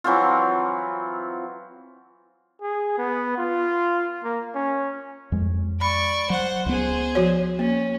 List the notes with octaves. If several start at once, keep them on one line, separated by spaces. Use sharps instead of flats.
E3 F#3 C4 F4
G#4
B3
F4
A#3
C#4
F2 G#3
D5 B5 C#6
F#3 C5 F#5
C#2 B3 G#4 C5
F3 F#4 C#5
A#3 C#4